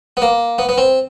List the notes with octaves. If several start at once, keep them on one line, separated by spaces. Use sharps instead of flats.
B3
A#3
B3
B3
C4